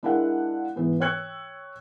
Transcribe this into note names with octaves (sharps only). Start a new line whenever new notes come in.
G#3 D4 E4 A#4 F5 F#5
G#2 E3 B3
C#5 G5 E6 F#6 G#6 C#7